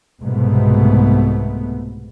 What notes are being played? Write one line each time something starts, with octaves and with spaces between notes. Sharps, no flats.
C2 G#2 B2 A3 B3